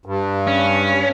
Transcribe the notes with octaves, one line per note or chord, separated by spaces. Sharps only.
G2
C#4